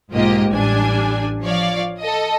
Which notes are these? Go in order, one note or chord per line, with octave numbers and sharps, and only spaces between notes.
B1 G#2 A#3 F4 G4 D#5
A1 G3 D4 G#5
F3 C#5 D5 F5
A4 D#5